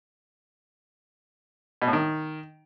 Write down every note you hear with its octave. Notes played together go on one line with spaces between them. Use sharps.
B2
A2
D#3